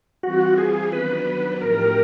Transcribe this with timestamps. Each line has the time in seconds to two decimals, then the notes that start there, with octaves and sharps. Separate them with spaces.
0.23 E3 G3 C4 F4 F#4
0.58 G#4
0.92 D#3 F#3 B3 D4 B4
1.61 A2 F3 A3 D4 G4 A#4